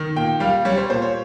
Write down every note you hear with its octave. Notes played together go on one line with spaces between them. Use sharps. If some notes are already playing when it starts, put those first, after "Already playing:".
Already playing: D#3
A#2 G5
G3 F5
G3 C#5
C5
A#2 C5
C#5